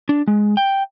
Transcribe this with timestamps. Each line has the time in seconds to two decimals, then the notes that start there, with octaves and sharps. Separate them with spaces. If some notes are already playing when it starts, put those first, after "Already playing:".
0.09 D4
0.27 G#3
0.57 G5